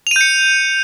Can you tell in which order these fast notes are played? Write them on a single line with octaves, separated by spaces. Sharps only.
F7 D#7 G6 C#7